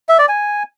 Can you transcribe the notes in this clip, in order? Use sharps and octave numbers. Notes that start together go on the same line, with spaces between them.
E5
D5
G#5